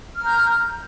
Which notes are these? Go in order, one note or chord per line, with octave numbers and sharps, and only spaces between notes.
A#5 F6 G6